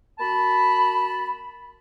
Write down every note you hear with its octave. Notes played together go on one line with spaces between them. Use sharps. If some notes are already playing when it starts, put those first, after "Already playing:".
A#3 F#4 A5 B5